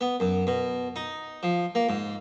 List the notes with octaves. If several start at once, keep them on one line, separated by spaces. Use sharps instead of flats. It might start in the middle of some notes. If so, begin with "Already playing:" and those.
B3
F#2
B2
D#4
F3
A#3
G#2